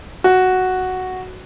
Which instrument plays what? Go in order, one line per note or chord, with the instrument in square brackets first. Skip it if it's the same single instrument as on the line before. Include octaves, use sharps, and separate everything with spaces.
[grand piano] F#4